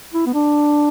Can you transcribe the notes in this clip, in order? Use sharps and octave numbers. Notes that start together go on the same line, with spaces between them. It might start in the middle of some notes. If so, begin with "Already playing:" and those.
E4
B3
D4